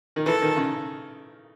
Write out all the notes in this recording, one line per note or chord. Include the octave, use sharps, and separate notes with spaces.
D#3
E3 A4
D#3
C#3